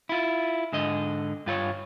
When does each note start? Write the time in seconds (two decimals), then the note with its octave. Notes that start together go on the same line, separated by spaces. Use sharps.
0.09 E4 F4
0.72 G#2 D3 D#5
1.46 G2 F4 B4 C#5